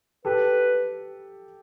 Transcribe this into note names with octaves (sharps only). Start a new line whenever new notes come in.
G4 A4 B4